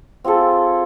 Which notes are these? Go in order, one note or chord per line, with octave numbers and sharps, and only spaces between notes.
C4 F4 G#4 A4